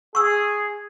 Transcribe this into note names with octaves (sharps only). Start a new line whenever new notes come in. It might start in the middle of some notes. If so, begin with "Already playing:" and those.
G#4 C#6 E6